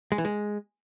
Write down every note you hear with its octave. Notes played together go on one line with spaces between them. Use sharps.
G#3
E3
G#3